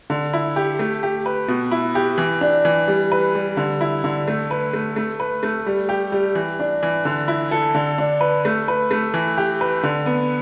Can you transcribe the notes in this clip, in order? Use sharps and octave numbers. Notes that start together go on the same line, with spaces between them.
D3
E4
G4
A3
G4
B4
B2
E4
G4
E3
D4
E3
G3
B4
G3
D3
E4
D3
A3
B4
A3
A3
B4
A3
G3
G4
G3
E3
D4
E3
D3
E4
A4
D3
D4
B4
A3
B4
A3
E3
G4
B4
D3
B3